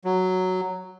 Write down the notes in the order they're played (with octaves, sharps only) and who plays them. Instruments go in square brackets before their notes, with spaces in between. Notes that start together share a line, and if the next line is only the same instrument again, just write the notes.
[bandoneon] F#3